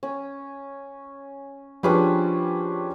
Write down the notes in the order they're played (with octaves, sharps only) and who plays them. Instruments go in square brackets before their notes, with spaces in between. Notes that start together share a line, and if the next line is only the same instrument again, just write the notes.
[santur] C#4
[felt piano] F3 G#4 B4 [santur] G3 C#4 D4